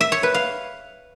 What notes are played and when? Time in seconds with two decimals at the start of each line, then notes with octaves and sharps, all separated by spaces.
0.01 E5
0.12 C#5
0.23 B4
0.34 F5